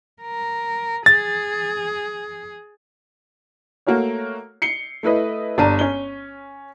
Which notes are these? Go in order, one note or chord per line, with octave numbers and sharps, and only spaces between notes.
A#4
G#4 A6
A3 A#3 F#4 A#4 C#5
C7 C#7 G7
A3 E4 B4 D#5
G1 D4 A5 A#5 D#7
C#4 G7